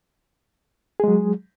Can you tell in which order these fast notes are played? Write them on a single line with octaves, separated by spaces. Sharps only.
G#4 G#3 F#3